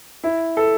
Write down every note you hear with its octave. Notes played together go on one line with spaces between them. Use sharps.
E4
A4